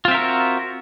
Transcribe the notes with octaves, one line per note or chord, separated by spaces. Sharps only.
C4 F4 F#4 A#4 E5